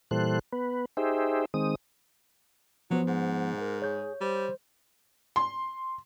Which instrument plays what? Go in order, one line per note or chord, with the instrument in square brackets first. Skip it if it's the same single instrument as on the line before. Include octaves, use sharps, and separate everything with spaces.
[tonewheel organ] A#2 E3 G3 A4 C5 F#6
B3 B4
D#4 G4 G#4 C5 E5
D#3 G#3 C4 D#6
[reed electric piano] F3 B3 C5 [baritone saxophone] F#3 [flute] F#4
[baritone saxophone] G#2 [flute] F#5
[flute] A#4
[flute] G#4 [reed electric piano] C#5 G6
[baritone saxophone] G3 [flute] C5
[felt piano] C6